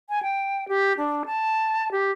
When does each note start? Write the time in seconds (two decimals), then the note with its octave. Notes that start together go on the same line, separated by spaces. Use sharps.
0.10 G#5
0.23 G5
0.68 G4
0.98 D4
1.26 A5
1.92 G4